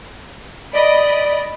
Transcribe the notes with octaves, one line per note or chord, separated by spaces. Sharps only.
D5 D#5 B5 D7